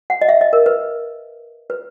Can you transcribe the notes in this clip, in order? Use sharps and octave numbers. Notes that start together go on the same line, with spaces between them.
F#5
D#5
E5
D#5
A#4
B4
B4